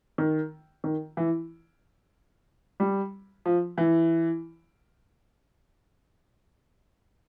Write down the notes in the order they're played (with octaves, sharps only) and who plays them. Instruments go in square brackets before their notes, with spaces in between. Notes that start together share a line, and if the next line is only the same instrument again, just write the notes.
[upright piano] D#3
D#3
E3
G3
F3
E3